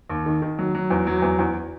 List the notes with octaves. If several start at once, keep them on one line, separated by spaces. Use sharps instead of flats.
D#2
D#3
D#3
F#3
F#3
E2
F#3
E2
E2